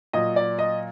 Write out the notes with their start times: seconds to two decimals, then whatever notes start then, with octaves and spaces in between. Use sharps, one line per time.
0.13 A#2 F#3 D#5
0.36 D5
0.59 D#5